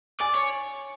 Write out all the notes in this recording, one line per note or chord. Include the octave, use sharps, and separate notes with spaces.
D5 G#5
C#5